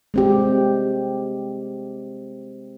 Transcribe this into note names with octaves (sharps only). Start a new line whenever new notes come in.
G#3 C4 G4